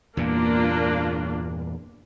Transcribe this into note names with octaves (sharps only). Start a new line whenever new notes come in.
E2 G2 A#2 A#3 D4 F4